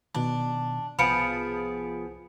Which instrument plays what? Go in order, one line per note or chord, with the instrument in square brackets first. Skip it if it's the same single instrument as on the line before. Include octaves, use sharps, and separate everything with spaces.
[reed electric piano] B2 D#3 [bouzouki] D4
[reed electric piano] C2 [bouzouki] F3 B3 G#4 [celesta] B5 C#7 D7